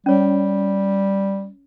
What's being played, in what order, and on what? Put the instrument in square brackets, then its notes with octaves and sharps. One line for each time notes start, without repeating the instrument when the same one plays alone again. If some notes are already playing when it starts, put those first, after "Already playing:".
[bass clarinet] G3 [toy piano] C#4 C#5